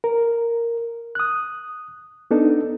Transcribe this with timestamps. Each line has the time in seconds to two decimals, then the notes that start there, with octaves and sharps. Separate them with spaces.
0.04 A#4
1.15 D#6 F#6
2.31 B3 D4 D#4 A4